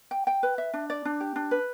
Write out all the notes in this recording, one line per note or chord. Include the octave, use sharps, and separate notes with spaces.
G5
G5
B4
E5
D4
D5
D4
G4
D4
B4